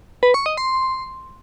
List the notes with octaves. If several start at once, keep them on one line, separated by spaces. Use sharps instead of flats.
B4
C#6
D#5
C6